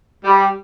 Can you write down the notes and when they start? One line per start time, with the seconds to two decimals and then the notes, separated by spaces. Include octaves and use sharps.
0.25 G3